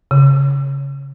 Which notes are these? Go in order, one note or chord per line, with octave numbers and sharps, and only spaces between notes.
C#3